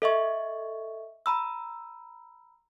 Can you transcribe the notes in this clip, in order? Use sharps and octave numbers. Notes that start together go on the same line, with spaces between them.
A4 D#5 E5 C#6
A#5 B5 E6